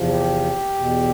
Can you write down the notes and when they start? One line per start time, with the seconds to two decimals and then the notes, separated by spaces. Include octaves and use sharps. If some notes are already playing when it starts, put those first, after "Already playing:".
Already playing: E2 C3 F3
0.10 G4
0.75 E2 B2